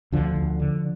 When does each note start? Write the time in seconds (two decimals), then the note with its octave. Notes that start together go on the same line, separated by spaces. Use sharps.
0.12 D2 D3 F3
0.36 D2
0.60 D3